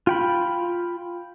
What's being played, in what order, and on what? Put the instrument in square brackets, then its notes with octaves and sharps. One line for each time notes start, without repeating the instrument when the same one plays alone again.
[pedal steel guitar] F4 G5 B5